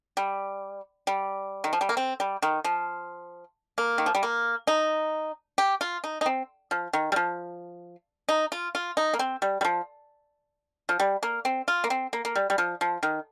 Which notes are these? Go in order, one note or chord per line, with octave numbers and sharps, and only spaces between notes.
G3
G3
D#3
F3
G3
A#3
C4
G3
D#3
F3
A#3
D#3
F3
G3
A#3
D#4
G4
F4
D#4
D#4
C4
F3
D#3
G3
F3
D#4
F4
F4
D#4
A#3
C4
G3
G3
F3
F3
G3
A#3
C4
F4
A#3
C4
A#3
A#3
G3
G3
F3
F3
D#3